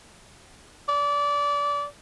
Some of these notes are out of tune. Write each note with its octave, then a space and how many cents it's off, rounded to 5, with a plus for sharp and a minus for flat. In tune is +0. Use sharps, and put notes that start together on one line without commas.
D5 -25